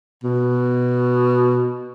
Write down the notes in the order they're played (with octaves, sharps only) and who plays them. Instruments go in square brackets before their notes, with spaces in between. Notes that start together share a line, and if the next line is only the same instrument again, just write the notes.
[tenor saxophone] B2